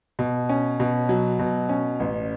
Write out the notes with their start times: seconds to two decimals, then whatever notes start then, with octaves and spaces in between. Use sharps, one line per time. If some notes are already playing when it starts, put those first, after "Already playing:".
0.19 B2
0.49 C#4
0.80 B2
1.09 F#3
1.39 B2
1.69 C#4
2.00 A1